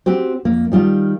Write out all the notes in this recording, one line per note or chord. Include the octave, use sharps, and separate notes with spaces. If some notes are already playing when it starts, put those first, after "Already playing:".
C4 F#4 G4 C5
F2 A#3
D#3 G3 F4